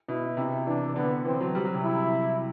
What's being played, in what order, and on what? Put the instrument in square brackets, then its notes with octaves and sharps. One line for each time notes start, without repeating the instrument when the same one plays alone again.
[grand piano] B2 [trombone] E4
[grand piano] C3 [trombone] E4
[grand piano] E3 [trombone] D4
[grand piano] E3
[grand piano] D3 [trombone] B3
[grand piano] E3 [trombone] C4
[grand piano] F#3
G3
F#3
C3
[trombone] E4